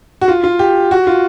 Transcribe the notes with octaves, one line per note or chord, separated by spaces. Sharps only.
F#4
F4
F4
G4
F#4
F4